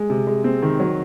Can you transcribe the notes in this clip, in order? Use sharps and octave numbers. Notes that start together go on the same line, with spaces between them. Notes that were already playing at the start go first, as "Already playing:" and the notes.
Already playing: G#3
C3
G#3
C4
D#3
F#3